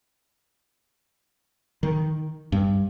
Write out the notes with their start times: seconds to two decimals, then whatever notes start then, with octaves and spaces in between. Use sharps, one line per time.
1.83 D#3
2.52 G2